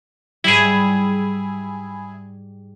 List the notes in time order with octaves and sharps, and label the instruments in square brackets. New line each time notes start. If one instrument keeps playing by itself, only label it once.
[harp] G#2 G3 [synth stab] E4 G#4